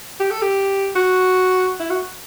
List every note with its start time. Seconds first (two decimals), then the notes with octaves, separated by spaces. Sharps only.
0.20 G4
0.31 A4
0.42 G4
0.96 F#4
1.80 E4
1.90 F#4